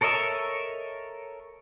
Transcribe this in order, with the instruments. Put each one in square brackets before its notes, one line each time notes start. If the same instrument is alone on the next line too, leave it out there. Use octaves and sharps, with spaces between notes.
[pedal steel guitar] A4 A#4 C#5 D#5 E5